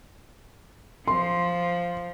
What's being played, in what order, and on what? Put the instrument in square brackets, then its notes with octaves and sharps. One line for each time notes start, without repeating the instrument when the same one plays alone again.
[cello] F3 [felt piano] C6